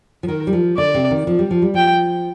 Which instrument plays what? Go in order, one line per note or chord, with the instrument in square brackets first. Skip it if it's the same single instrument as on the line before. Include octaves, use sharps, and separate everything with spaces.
[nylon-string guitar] F3
[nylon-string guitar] D#3 [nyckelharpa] A#4
[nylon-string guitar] G3
F3
[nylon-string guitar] D3 [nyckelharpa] D5
[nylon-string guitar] C3
D#3
F3
G3
F3
G3
[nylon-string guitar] F3 [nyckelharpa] G5